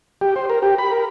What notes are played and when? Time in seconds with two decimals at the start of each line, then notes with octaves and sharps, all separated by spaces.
0.21 G4
0.36 C5
0.50 A#4
0.62 G4
0.78 B5
0.92 A#4